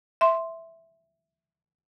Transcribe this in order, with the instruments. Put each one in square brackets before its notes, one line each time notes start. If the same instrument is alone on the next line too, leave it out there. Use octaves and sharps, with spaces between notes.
[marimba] E5 C6